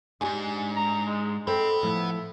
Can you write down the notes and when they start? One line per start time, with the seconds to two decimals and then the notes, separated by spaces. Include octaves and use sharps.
0.21 E2 G#2 D4 D#4 G4 G#5
0.76 A#5
1.06 G#3
1.47 C4 A4 C5 D#5 F#5 B5
1.83 A2 F3 E4